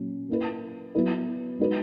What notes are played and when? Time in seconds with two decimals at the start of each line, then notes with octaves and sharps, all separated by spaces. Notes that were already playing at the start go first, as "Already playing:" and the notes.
Already playing: A#2 F#3 C#4
0.29 A#3 E4 B4
0.95 F#3 B3 E4 B4
1.59 G#3 D#4 F#4 B4